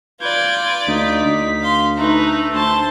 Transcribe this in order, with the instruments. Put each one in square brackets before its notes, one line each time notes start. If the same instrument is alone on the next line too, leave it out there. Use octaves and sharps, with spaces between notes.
[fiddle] F4 D5 [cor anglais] B4 [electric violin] G6 G#6
[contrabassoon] D2 [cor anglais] D#4 [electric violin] B6
[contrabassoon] D2
[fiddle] F5 C6
[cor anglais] A3 [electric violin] D#4 B4 [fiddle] A#5
[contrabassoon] D2 [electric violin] C5 A5 [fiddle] C6